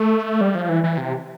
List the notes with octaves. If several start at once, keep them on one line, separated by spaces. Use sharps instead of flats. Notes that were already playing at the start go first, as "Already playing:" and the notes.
Already playing: A3
G3
F3
E3
E3
C3